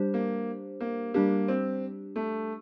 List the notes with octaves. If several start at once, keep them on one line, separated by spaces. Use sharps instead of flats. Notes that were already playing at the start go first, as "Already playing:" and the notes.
Already playing: G3 D4 G4 C5
A#3
A#3
G3 A#3 D4 G4
C4
A3